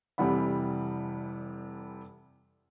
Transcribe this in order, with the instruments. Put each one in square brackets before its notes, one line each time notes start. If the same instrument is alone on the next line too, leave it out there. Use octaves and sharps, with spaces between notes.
[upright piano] F1 C3 E3 G3 F#5 B5